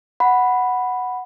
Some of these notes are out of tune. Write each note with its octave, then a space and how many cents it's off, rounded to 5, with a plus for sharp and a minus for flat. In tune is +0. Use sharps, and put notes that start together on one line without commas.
F#5 +0 B5 +0